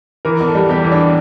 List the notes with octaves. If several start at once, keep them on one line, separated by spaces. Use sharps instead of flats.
E3 A#4
E2
A4
G3
E2 G4
E3
D4